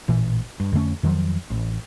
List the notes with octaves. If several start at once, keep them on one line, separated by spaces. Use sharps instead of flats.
A1 A#2 E3
G2
F2 D3 A3 C#4
F2 D#3 F3 F#3
A1